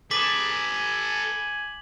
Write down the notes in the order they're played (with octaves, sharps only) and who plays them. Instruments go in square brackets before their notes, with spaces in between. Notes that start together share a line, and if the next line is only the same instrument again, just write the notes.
[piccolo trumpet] G#4 [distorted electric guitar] A4 B4 [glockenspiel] D6 B6 [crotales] F#7
[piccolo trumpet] G#5